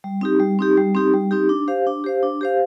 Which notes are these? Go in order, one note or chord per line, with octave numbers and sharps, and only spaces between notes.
G3
C4 D#4 G4
G3
C4 D#4 G4
G3
C4 D#4 G4
G3
C4 D#4 G4
D4
G4 C5 F5
D4
G4 C5 F5
D4
G4 C5 F5